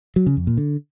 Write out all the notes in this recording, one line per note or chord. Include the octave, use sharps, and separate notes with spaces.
F#3
C#3
F2
A#2
D3